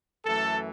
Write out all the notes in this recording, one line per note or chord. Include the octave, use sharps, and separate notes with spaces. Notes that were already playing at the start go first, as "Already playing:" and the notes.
F#2 E3 A3 A4